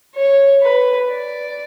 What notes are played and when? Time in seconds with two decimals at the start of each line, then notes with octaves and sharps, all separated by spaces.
0.15 C#5
0.62 B4
1.10 D5